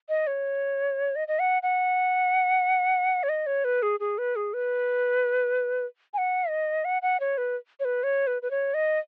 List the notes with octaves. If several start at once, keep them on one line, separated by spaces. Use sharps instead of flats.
D#5
C#5
D#5
D#5
F#5
F#5
C#5
D#5
C#5
B4
G#4
G#4
B4
G#4
B4
G#5
F#5
D#5
F#5
F#5
C#5
B4
C#5
B4
C#5
B4
B4
C#5
D#5